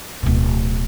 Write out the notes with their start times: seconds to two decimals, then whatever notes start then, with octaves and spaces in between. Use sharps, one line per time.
0.23 D1 B2